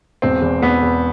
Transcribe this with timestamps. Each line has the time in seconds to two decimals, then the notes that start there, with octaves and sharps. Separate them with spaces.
0.22 E1 C4
0.42 E2
0.62 E2 B3
0.82 E2